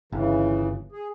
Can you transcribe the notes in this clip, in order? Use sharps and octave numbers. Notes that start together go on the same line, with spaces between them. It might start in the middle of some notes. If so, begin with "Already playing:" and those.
G1 C#3 E3
G#4